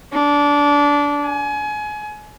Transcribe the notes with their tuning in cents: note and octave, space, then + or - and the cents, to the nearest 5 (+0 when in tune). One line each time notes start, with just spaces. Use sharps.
D4 -20
G#5 +25